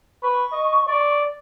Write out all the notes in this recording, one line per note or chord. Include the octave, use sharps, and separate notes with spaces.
B4 C#6
D#5
D5